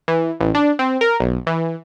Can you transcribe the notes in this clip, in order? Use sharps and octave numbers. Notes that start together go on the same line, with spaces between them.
E3
A1
D4
C4
A#4
B1
E3